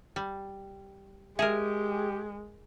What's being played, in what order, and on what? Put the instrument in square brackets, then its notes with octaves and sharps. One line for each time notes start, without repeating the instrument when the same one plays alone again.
[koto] G3
[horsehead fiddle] G#3 [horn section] G4 [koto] G#4 A#4 [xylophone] E5 E7